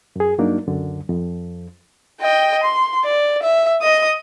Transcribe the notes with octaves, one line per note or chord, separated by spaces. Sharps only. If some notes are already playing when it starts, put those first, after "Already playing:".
F#2 G#4
G2 F#3 A#3 D4 D#4
C#2 F#2 D3
F2
D#5 G5
C6
D5
E5
D#5 D#6